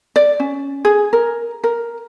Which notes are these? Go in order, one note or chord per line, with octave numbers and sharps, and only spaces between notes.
D5
C#4
G#4
A#4
A#4